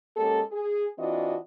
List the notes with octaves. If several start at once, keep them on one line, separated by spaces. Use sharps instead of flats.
G#3 A#3 C#4 G4 A4
G#4
E3 C4 D4 F4 F#4 D#5